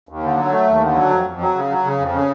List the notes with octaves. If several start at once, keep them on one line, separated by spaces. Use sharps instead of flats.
D#2
D3
F#3
A3
D#2
D3
F#3
F2
F2
F#3
C#3
F#3
C#3
F2
C#3